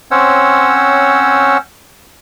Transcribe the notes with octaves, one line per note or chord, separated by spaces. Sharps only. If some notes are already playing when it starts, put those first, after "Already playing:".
C4 C#4 C5 C#5 F#5 E6